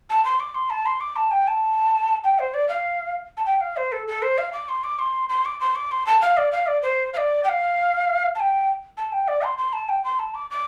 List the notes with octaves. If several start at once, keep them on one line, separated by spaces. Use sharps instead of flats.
A5
C6
D6
C6
A5
C6
D6
A5
G5
A5
G5
C5
D5
F5
A5
G5
F5
C5
A4
A4
C5
F5
D6
C6
D6
C6
C6
D6
C6
D6
C6
A5
F5
D5
F5
D5
C5
F5
D5
G5
F5
A5
G5
A5
G5
D5
C6
C6
A5
G5
C6
A5
D6
D6